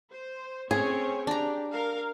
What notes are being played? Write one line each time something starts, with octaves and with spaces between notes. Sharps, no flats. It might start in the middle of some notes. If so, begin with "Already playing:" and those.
C5
C4 C#4 G#4 C#5
D4 G4 A#5
A#4 F5